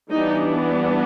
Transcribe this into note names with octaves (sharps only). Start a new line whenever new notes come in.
E3 G3 B3 D4 D#4